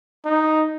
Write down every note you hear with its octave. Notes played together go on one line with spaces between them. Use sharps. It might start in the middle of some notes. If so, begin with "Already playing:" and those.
D#4